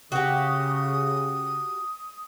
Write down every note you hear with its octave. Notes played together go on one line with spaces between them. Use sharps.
C#3 F#4 G4 D#6